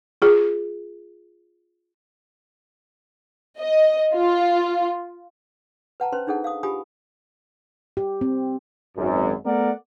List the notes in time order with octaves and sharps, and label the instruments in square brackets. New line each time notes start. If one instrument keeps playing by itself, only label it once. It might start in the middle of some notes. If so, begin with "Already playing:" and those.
[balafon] F4 G#4
[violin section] D#5
F4
[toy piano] B4 F#5 A5 A#5
C#4 B4 C5 C6
D4 D#4 G#4 A4 F#5
F5 D#6
F4 G4 G#5 B5 D#6
[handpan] G4
C4
[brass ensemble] G#1 F#2
A3 B3 A#4 D5 F#5